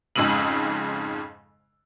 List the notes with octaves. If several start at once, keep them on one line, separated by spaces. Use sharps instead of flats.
F2 G#2 C#3 E6 D#7 F#7